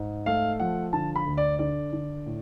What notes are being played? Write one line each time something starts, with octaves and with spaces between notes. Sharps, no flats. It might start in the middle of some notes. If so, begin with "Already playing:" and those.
Already playing: G#2
A3 F5
F3 F#5
D3 A5
B5
D2
D5
D3 D5
D3
A2